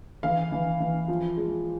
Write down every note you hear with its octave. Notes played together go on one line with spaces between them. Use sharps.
E3 F5
E3
E3
F3
G#3